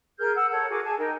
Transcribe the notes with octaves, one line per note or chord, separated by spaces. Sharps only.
G#4 A#4 F6 G6
F#5 E6
A4 A#4 C#5 F#5
F#4 G#4 A#4 D6
G#4 G#5 A5
D#4 A#4 G5